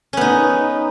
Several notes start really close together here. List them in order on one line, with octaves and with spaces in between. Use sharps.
C#4 B3 D#4